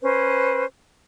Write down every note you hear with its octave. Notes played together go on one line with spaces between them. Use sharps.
C#4 B4 C5